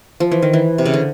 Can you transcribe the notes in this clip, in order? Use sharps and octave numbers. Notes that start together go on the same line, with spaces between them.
F3
E3
D#3
E3
C3
C#3
D3